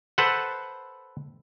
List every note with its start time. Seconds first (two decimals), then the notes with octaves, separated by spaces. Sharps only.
0.18 A4 B4 C5 F#5